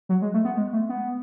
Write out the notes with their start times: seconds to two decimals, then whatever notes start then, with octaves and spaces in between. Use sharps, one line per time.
0.09 F#3
0.22 G#3
0.34 A3
0.45 B3
0.57 G#3
0.73 A3
0.89 B3